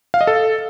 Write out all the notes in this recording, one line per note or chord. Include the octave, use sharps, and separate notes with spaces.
F5
D#5
A4